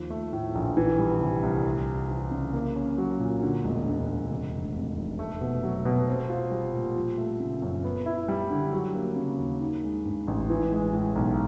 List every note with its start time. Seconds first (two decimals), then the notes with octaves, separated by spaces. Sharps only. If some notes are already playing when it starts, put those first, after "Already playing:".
Already playing: D#2 F3
0.10 A3
0.33 A2
0.55 A#1
0.77 E3
0.99 G3
1.21 C3
1.43 C2
1.65 A3
1.87 C4
2.09 E3
2.31 C#3
2.53 A#3
2.76 C#4
2.98 F#3
3.20 A#2
3.42 D3
3.64 E1
3.86 D2
4.08 E1
4.30 C3
4.53 F1
4.75 F2
4.97 F1
5.19 A3
5.41 B2
5.63 F#3
5.85 B2
6.08 C4
6.30 F4
6.51 G3
6.73 A#2
6.96 F3
7.18 A3
7.40 C#3
7.62 F#2
7.84 B3
8.06 E4
8.28 G3
8.50 D3
8.72 F#3
8.95 A#3
9.16 C#3
9.38 D#2
9.61 D#3
9.83 G#3
10.05 G2
10.28 A1
10.50 E3
10.71 G#3
10.93 A2
11.15 B1